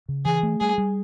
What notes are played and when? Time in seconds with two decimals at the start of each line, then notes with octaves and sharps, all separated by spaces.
0.08 C#3
0.25 E3 G#4
0.43 A3
0.60 G3 G#4
0.78 G3